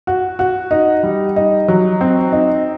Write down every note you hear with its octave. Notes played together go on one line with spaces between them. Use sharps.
F#4
F#4
D#4
G3
D#4
F#3
C4
D#4